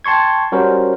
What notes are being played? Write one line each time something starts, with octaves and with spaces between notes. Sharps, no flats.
G5 A5 C6 C#6 G#6
G3 C#4 F#4 A#4 C5